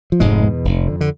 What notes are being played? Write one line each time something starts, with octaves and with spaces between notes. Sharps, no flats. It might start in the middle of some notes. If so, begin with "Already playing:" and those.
F3
F1 G#2 G#3
E2 B2
F1
F2 D3
D3